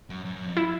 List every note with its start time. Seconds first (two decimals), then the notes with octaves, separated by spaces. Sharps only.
0.10 F#2
0.25 F#2
0.35 F#2
0.46 F2
0.57 E4